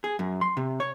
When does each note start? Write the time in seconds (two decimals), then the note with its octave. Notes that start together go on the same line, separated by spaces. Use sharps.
0.04 G#4
0.19 F#2
0.41 C6
0.57 C3
0.80 C#5